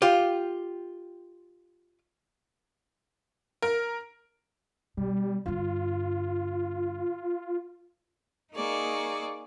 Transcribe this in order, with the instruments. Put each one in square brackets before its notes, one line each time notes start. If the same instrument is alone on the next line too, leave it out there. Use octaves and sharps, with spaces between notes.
[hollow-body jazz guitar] F4 G4
[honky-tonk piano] A#4
[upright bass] B2 [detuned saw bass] G3
[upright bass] G2 D3 [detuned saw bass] F4
[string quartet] A#3 D#4 G#4 D5 C#6